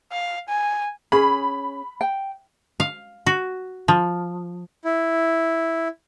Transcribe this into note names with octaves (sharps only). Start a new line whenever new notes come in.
F5
G#5
C#4 G#4 B5
G5
F5
F#4
F3
E4